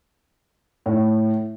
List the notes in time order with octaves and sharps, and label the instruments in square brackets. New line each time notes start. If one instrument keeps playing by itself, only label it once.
[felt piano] A2